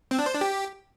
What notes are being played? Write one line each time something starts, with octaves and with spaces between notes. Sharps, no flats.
C4
D4
C5
D4
G4